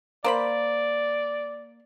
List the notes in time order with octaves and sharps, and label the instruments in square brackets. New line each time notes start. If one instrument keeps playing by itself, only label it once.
[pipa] A#3 C5 B5 [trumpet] D5